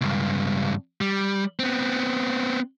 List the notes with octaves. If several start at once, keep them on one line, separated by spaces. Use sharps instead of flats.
C#2 G2
G3
B3 C4